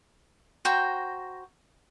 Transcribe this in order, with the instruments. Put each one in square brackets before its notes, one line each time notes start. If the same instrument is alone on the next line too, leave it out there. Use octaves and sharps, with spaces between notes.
[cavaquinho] F#4 C5 G5 A#5